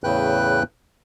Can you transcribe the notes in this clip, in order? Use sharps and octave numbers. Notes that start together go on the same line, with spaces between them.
E2 A2 C#3 B4 G5 F#6